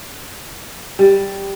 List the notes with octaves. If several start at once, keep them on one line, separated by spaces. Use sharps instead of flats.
G3